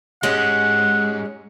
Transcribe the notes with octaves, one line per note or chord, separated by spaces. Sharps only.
E2 G#2 G#3 C#4 G4 F#5